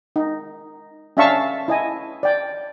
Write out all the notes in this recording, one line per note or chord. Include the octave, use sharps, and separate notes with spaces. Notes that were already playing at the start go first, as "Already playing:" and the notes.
D#4
C#4 D4 E5 F5 A5 C#6
E4 D#5 G#5
D5 G5